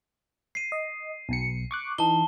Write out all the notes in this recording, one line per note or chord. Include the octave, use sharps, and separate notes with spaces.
C7 D#7
D#5
B1 B2 C#7
C#6 D6 F#6
E3 D#4 A5 G7